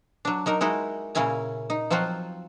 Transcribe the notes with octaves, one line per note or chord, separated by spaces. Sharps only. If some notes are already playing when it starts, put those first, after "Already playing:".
F#3 D4
F#3 D#4 A#4
G#3 D#4 E4 F#4
A#2 C#3 C#4 E4 G#5 A#5
D#4
F3 F#3 C4 F4 F#4